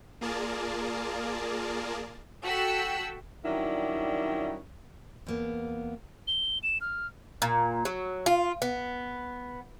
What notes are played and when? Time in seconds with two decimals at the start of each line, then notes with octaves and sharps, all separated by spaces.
0.21 A#3 F4 G#4 A#4 D5 A5
2.44 F#4 A4 G5 E6 F#6 B6
3.44 D#3 F#3 G3 C#4 D4 E4
5.27 E2 A#3 B3
6.28 G7
6.63 E7
6.81 F6
7.42 A#2
7.85 F#3
8.26 F4
8.62 B3